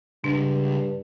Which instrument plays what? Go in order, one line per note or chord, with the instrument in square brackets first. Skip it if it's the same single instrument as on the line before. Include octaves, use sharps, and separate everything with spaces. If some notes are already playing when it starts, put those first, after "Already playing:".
[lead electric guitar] C#2 [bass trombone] G2 [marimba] D4